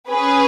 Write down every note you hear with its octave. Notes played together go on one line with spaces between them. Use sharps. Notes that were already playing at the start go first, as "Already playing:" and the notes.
C#4 G#4 B4